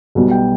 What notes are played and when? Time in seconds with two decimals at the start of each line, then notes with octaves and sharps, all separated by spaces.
0.15 B1 B2 G3
0.31 G5